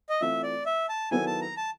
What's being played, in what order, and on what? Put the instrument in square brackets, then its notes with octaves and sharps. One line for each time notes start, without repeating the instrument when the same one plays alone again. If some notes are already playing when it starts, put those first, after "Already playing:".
[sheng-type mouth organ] D#5
[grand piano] E3 A3 C4 F4 [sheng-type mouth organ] E5
[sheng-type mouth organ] D5
E5
A5
[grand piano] D#3 F#3 B3 E4 A4 [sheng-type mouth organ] G#5
[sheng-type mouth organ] A5
A#5
A5